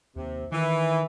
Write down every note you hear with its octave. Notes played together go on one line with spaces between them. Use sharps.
D#2 C3
D#3 E3